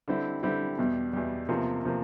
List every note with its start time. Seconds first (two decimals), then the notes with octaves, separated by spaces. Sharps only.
0.08 D3 G3 C4 E4
0.43 D3 G3 C4 E4
0.78 E2 B2 G3
1.13 E2 B2 G3
1.49 E2 C3 F3 A#3
1.85 C3 F3 A#3